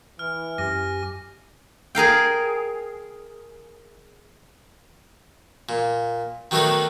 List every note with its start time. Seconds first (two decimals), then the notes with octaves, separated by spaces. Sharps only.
0.19 E3 F6
0.58 F#2 G4 G#5 A#6
1.95 G#4 A#4 F5 G5
5.69 A#2
6.51 D#3 F#3 A3 B3 D4 D#4